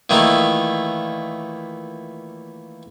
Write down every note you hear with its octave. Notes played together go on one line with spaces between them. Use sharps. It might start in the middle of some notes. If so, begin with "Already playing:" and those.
A#2 D#3 E3 A3 A#3 D#4